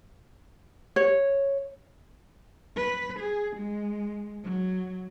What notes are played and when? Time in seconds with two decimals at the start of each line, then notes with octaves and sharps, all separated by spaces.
0.96 C#5
2.76 B4
3.19 G#4
3.56 G#3
4.43 F#3